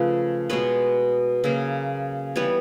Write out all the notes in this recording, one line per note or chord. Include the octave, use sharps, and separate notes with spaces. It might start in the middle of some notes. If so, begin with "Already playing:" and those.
Already playing: C#3 F3 A3 B4
B2 G#3 B3 B4 C#5
C#3 F#3 A#3
E3 G3 B3 B4 C#5